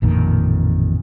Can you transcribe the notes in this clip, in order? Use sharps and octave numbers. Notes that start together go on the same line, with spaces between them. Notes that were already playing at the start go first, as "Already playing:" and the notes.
A1 F2 A#2 D#3